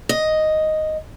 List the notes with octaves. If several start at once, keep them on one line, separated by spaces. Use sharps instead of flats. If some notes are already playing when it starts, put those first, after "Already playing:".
D#5